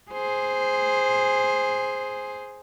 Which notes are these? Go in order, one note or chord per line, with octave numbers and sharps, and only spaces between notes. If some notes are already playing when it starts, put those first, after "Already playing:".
G#4 C5